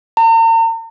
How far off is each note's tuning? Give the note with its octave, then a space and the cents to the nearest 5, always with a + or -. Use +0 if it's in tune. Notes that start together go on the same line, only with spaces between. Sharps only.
A#5 -45